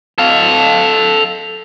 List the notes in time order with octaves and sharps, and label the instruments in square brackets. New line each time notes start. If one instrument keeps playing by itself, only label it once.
[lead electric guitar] A4 F5